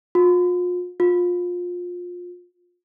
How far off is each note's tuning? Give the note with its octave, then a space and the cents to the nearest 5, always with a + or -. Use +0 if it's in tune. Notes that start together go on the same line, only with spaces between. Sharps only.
F4 +40
F4 +25